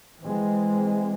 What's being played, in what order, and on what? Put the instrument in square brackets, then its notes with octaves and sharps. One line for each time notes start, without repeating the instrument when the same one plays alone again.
[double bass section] E3 G#3 C4